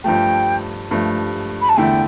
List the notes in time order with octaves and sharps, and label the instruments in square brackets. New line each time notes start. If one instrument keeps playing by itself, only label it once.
[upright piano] G2 F3 A3 [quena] G5
[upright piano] G2 F3 A3
[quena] B5
A5
[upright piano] E2 D3 A3 E4 [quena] G5